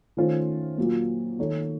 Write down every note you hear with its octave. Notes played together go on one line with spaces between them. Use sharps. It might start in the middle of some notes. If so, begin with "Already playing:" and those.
D#3 A3 C#4 F4 C5
A#2 F#3 A#3
D#3 A#3 D#4 A4 C#5